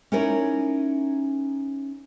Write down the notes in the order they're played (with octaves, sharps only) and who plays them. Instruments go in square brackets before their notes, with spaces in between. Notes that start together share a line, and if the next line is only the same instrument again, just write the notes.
[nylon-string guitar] C#4 D#4 E4 A#4 C#5 D5